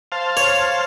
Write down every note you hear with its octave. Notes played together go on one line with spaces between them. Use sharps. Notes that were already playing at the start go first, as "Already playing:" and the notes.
C5 F5 A5
C#5